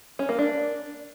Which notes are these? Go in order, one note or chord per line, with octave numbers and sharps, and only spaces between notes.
C#4
A#3
D4